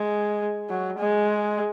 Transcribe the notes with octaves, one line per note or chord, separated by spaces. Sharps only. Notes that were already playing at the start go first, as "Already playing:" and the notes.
Already playing: G#3
F#3
G#3